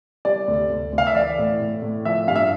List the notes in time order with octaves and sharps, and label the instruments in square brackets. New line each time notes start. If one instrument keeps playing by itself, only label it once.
[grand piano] G3 [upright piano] D5
[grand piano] D2
D2
D2
[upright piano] F5
E5
[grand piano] E3 [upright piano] D5
[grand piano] A2
A2
A2
[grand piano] F3 [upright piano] E5
[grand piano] G2 [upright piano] F5
[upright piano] E5